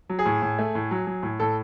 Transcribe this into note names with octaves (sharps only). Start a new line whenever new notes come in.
F#3
G#4
A2
A2
A3
A2
F#3
F#3
A2
A2 A4